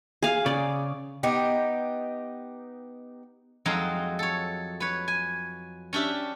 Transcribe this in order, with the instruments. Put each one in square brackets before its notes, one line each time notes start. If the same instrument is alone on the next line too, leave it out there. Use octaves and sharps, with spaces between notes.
[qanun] G#4 F5
[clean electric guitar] C#3 [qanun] D5
[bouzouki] B3 D#4 G4
[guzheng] F2 F#3 G#3 D#4 F5 A#5
A4 C#5
B4 C#5
G#5
C#4 D4 G4 E5